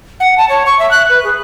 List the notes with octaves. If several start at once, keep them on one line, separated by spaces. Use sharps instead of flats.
F#5
A5
C#5
C#6
E5
F#6
B4
G#4